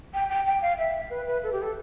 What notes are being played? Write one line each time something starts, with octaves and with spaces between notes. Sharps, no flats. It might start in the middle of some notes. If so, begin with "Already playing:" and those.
G5
G5
G5
F5
E5
B4
B4
A4
G4
A4